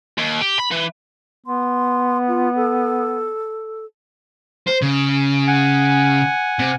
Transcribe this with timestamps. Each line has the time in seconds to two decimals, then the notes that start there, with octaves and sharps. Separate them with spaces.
0.18 D#2
0.41 G4
0.59 B5
0.71 E3
1.47 B3 C6
2.28 F4
2.56 A4
4.67 C5
4.82 C#3
5.47 F#5 G#5
6.59 C3